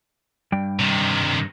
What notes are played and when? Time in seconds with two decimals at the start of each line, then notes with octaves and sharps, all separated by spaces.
0.52 G2 G3 G5
0.79 C3 D#3